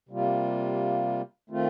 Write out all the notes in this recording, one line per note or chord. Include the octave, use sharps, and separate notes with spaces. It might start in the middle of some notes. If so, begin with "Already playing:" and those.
C3 G3 A#3 F4
D#3 A3 C4 F4